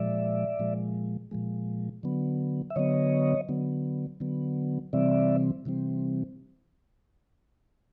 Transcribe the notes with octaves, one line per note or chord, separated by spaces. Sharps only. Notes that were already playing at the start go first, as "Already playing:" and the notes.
Already playing: A#2 F3 G#3 D5 E5
A#2 F3 G#3
A#2 F3 G#3
D3 F#3 B3
E5
D3 F#3 B3 C#5 D#5
D3 F#3 B3
D3 F#3 B3
C3 E3 G3 C4 D5 E5
C3 E3 G3 C4